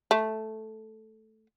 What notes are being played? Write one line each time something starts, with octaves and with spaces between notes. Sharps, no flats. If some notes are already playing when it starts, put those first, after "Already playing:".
A3